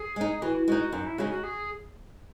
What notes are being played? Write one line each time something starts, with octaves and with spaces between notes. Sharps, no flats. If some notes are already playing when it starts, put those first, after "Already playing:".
Already playing: G#4
G#3 D#4
E3 F#4
G#3 D#4 F#4
F#2 D#4
E4
C#3 G#3 D#4 F#4
F#4
G#4